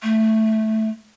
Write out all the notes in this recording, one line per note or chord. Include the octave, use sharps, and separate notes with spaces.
A3